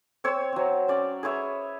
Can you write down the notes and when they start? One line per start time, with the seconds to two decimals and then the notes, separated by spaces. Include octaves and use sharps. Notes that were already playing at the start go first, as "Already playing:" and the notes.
0.24 C4 C#5 E6
0.53 F#3 C4
0.88 C#4 D5
1.23 G#4 B4 C#5 E5